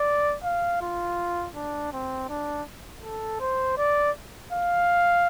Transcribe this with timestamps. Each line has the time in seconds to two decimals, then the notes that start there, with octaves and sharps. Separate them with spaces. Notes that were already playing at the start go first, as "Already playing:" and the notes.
Already playing: D5
0.44 F5
0.81 F4
1.56 D4
1.93 C4
2.29 D4
3.03 A4
3.40 C5
3.78 D5
4.52 F5